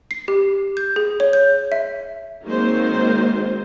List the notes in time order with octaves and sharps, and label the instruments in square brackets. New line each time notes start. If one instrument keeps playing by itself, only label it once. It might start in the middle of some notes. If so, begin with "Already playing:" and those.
[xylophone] C7
G4
G6
G#4
C#5
G6
E5
[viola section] D#3 F#3 G#3 A#3 C4 C5